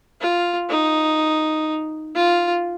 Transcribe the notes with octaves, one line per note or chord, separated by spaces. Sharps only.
F4
D#4
F4